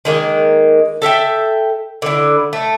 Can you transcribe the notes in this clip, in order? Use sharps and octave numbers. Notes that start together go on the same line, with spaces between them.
D#3 G#3 A#3
A4 E5 F5 G5
D3 E4
A3